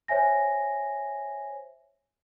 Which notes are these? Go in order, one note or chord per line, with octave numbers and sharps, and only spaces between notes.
C5 C#5 E5 G#5 A#6